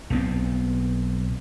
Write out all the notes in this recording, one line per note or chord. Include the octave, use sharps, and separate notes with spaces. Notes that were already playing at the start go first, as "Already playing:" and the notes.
B1 B3 C4